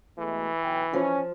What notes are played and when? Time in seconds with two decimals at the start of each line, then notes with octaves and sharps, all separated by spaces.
0.18 B2 E3 G#3 A3
0.62 B1 B4 G5
0.93 F3 C#4